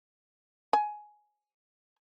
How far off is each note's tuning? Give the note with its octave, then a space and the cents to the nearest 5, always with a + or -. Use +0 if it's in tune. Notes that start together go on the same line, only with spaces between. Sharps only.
G#5 +10